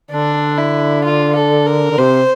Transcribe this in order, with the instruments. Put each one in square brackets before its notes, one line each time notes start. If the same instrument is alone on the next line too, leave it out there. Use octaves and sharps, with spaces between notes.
[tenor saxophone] D3 [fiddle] D4
[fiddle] E4
F4
A4
A#4
[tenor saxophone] D3
[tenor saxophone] C3 [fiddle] C5